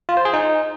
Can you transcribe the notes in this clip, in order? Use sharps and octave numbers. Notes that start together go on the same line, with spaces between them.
F4
C5
G#4
D#4